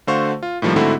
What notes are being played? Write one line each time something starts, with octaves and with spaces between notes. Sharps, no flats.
D3 A3 F#4 C5 F5 C#6
F4
A2 D#3 F3 G3 A#3
G#2 D3 A3 C4 E4 F#4